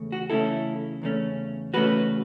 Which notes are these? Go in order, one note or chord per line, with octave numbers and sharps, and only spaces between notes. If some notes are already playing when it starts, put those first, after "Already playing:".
Already playing: E2 C#3 A3 C#4
F#4
E2 C#3 A3 C#4 E4 A4
E2 C#3 A3 C#4
E2 C#3 A3 C#4 F#4 B4